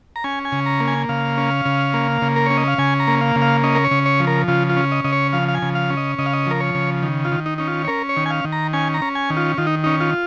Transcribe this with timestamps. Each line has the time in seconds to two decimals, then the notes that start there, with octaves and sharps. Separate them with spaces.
0.16 A#5
0.24 C#4 G#5
0.45 G#5
0.52 C#3
0.66 A#5
0.80 A#3
0.88 G#5
1.09 C#3 F5
1.38 C#4
1.65 C#3
1.94 A#3
2.22 C#3
2.36 A#4
2.46 C#4 C#5
2.57 D#5
2.68 F5
2.78 C#3 G#5
3.00 A#5
3.08 A#3
3.21 F5
3.36 C#3
3.42 F5
3.63 C#4 D#5
3.75 A#4
3.85 C#5
3.91 C#3
4.06 C#5
4.20 F3
4.27 A#4
4.48 C#3 F4
4.70 F4
4.77 C#4
4.92 D#5
5.04 C#3 D#5
5.13 C#5
5.33 F3 F5
5.48 F5
5.55 G#5
5.62 C#3
5.75 F5
5.90 C#4
5.97 D#5
6.18 C#3 D#5
6.26 F5
6.33 D#5
6.47 F3 A#4
6.60 C#5
6.75 C#3
7.03 D#3
7.25 F4
7.32 D#3
7.46 D#4
7.58 C#4 D#4
7.67 F4
7.85 C#5
7.88 C#4 A#4
8.09 C#5
8.17 D#3
8.26 G#5
8.30 F5
8.45 D#3
8.52 A#5
8.73 C#4 G#5
8.94 A#5
9.02 C#4
9.15 G#5
9.30 D#3
9.37 F4
9.58 D#3 F4
9.67 D#4
9.84 C#4 D#4
10.01 F4